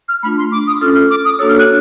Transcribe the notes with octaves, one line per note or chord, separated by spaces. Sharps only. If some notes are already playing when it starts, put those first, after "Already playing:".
F6
A3 D4 F4 B5
C6
D6
D#6
C#4 F4 A4 F6
F6
D6
D#6
A#3 D4 F#4 A4 C#5 E6
F6
F#6